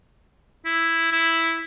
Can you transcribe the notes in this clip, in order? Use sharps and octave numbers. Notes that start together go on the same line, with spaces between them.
E4
E4